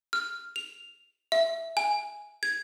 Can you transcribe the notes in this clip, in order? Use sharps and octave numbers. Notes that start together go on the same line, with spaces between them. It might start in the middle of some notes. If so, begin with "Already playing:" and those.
F6
F7
E5
G#5
G#6